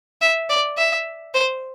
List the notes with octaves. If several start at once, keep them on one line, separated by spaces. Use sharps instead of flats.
E5
D5
E5
C5